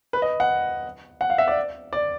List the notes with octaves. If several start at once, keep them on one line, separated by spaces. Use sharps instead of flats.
B4
D#5
F#5
F#5
F5
E5
D5
D5